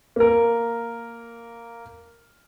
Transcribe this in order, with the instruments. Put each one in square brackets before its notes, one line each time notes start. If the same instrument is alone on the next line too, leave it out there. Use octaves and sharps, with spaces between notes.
[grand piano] A#3 A#4